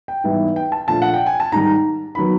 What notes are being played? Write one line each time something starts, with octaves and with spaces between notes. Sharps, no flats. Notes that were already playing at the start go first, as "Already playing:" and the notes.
G5
G#2 E3 G3 B3 E4
G5
A5
A#2 F3 A3 D4 A5
F#5
G5
G#5
A5
G#2 D#3 G3 A#5
D#3 F#3 B3 B5